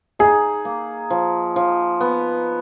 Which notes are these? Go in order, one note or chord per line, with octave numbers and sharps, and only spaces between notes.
D#4 G#4
A#3
F3
F3
B3